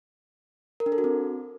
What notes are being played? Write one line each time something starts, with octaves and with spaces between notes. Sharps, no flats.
A#4
D4
A4
F#4
C4